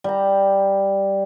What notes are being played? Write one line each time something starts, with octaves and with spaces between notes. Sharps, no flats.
G3 A#5